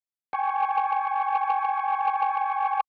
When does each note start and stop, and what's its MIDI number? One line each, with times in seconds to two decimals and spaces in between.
0.33 2.81 79
0.33 2.81 80
0.33 2.81 85